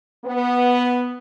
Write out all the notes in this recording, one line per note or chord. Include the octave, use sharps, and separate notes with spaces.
B3